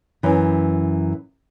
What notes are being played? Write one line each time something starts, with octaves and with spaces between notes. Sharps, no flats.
F#2 E3